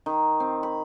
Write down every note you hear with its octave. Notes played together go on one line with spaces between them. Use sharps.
D#3
C4
B5